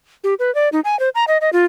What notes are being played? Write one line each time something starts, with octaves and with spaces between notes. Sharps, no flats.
G4
B4
D5
D#4
G#5
C5
A#5
D#5
D#5
F4